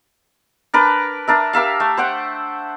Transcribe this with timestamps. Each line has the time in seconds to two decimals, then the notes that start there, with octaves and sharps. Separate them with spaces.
0.74 D4 A#4 B4
1.28 D4 A#4 E5
1.53 G4 A#4 E5 F5
1.80 A3
1.97 C5 F#5 G5